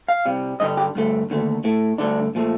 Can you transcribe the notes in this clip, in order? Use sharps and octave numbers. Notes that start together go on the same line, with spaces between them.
F5
C2 C3 G3
G2 D3 G3 D#5
G4
G2 D3 A3
D#2 D3 A3
A2 A3
G2 D3 A3 D4
A#2 F3 A3